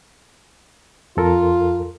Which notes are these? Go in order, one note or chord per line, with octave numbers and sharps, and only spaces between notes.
F2 F4 A4 A#4